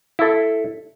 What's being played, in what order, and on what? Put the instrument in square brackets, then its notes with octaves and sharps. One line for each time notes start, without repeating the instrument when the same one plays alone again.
[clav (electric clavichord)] E4 A4